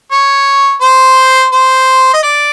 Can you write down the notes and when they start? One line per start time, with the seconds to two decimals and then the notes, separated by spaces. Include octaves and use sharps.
0.11 C#5
0.81 C5
1.52 C5
2.14 D#5
2.23 D5